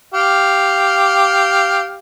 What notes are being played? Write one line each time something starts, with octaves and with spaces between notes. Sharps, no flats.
G4 F5